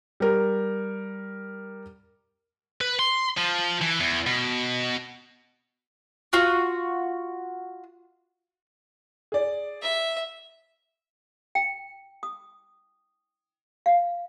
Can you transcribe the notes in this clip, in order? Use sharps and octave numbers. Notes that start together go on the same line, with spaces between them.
G3 A#4
B4
C6
F3
E3
E2
B2
F4 F#4
G#4 D5
E5
G5
D#6
F5